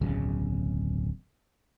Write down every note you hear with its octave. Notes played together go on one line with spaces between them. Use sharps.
D1 B1 C#3